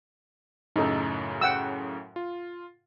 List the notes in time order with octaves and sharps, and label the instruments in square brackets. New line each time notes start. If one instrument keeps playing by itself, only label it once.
[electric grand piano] F#2 A2 C#3 [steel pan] D#4 A4
[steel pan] F#5 G5 E6
[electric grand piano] F4